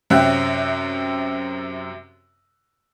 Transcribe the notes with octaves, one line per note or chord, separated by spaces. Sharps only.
F#2 C3 E5 G5 F#6